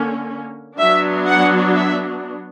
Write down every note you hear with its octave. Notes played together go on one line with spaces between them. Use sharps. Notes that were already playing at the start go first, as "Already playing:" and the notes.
Already playing: D3 A#3 C#4
F#3 B3 D4 E5
F#5
E5